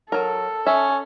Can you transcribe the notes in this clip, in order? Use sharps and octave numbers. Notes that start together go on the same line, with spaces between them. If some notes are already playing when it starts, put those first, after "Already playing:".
F#3 A4 A#4
C#4 E5